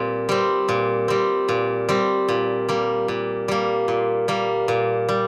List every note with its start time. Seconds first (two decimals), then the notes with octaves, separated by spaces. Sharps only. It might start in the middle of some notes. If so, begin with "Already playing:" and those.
Already playing: A#2 G3 C4
0.29 G3 C4
0.69 A#2
1.08 G3 C4
1.49 A#2
1.89 G3 C4
2.29 A#2
2.69 G3 A#3
3.08 A#2
3.48 G3 A#3
3.88 A#2
4.28 G3 A#3
4.68 A#2
5.09 G3